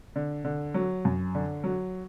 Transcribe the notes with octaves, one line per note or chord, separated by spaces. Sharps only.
D3
D3
F#3
F#2
D3
F#3